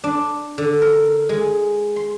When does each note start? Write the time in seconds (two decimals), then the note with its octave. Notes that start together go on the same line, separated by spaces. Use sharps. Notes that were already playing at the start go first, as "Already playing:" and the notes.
0.04 D4
0.58 D3
0.82 A#4
1.29 G#3
1.96 C6